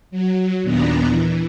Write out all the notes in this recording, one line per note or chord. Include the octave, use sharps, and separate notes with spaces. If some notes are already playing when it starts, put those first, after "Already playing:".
F#3
D#2 A#2 B3 D4 A#5
E3